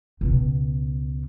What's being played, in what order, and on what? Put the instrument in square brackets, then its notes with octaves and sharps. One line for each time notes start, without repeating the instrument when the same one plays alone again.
[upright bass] C#2 B2